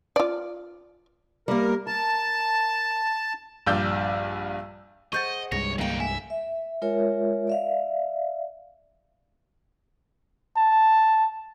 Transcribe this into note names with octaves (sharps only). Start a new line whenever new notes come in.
F4 D5
G3 A#3 A#4
A#4 A5
A#1 G2 D5 E6 G6
G#4 C5 D#5 F#5 C#6 G6 A6
C2 G2 G#3 C#5 A#6
D2 A#3 D#4 G5
E5 G#5
E5
G#3 F4 A#4 C#5 E5
D5 E5 F5
A5